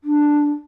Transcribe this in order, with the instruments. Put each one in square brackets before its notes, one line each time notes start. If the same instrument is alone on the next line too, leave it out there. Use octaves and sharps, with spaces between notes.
[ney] D4